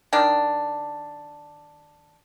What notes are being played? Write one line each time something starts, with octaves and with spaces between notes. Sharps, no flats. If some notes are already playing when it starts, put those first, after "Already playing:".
D#3 D4